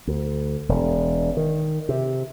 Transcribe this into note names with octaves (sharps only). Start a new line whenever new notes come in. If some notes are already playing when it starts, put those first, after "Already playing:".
D2
E1
D#3
C3